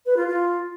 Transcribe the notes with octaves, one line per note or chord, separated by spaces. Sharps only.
B4
F4
F4